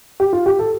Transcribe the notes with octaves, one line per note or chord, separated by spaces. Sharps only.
G4
F4
G4
A4